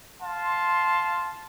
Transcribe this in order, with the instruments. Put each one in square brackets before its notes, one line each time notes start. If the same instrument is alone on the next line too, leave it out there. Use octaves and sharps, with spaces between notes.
[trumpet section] F5 A5 C6